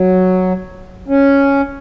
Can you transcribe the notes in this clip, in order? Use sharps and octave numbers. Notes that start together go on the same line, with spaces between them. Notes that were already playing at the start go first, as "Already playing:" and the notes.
Already playing: F#3
C#4